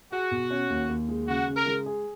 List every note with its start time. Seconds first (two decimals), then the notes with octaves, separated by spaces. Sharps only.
0.12 F#4 G#4
0.31 B2
0.51 C#4
0.70 D#2
0.89 D#2
1.09 G#3
1.28 C#3 F#4
1.48 C#3
1.56 A#4
1.66 G#3
1.86 G#4